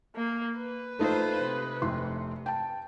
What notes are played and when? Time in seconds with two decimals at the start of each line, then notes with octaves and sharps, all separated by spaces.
0.16 A#3
0.59 B4
0.99 A3 D#4 F4 C5
1.44 C3
1.82 F1 C6
2.46 G5 A5